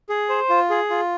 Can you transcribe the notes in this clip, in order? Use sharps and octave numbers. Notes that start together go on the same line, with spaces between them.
G#4
C5
F4
G#4
F4